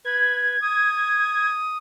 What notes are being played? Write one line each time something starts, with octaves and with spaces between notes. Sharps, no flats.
B4 G#6
D#6